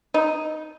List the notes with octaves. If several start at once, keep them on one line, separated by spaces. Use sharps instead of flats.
D#4